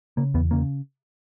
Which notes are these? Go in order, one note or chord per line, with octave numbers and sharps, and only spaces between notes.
C#3 A#3
E2 B3
C#3 A#3